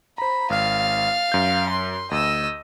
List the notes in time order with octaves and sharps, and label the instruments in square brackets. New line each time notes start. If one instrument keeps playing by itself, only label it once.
[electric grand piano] C5 A#5 [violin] B5
[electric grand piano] G#1 F6 [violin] F5 A6
[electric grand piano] F#2 G6
[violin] C6
[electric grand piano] D2 [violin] D#5 E6